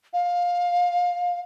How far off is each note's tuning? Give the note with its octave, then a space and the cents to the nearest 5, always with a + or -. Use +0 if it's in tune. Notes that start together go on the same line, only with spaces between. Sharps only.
F5 +20